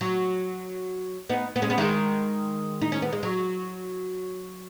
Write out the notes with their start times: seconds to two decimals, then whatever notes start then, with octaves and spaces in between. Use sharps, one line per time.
0.01 F#3
1.30 B3 D#4
1.56 B3
1.62 G#3 C#4
1.70 B3
1.78 D#3 G#3
2.82 D#4
2.92 C#4
3.02 B3
3.13 G#3
3.23 F#3